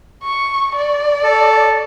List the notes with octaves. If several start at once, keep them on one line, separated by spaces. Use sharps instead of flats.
C#6
D5
A4